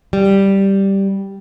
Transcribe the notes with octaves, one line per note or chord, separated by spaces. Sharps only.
G3